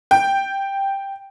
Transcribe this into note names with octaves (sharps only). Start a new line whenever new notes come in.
G5